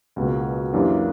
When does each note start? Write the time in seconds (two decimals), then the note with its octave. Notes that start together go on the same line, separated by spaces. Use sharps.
0.16 C#2 B2 A#3
0.73 F#2 E3 A#3 D4 G4